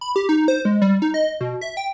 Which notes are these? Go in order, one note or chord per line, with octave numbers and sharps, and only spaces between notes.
B5
G4
D#4
C5
G#3
G3
D#4
D#5
B2
E5
G5